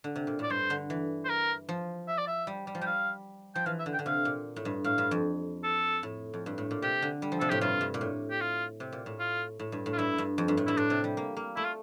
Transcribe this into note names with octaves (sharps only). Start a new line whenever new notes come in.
D3
C3
A#2
A2 D5
G2 C5
D3
E3
C5
A#4
F3
E5
D5
E5
G3
G3
F3
G3 G5
F5
F3 G5
E3 F5
E5
D3
G5
D3
C3 F5
A#2
A2
G2
A2 F5
G2
F2
A4
A2
F2
G2
A2
A#2
C3 G4
D3
G3
F3
C3 A4
A2 G4
G2 F4
G2
A#2
A2
G4
F4
C3
A#2
A2
F4
A2
G2
A2
F4
G2 E4
G2
F2
G2
A2
G2 E4
A2 D4
C3
G3
A#3
A#3
A3 E4
F4